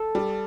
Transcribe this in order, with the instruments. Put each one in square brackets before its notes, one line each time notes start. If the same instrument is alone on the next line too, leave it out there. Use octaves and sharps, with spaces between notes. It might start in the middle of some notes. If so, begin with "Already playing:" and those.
Already playing: [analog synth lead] A4
[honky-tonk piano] G3